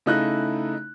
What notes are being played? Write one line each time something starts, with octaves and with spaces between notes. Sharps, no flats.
C#3 A3 D#4 E4 F#6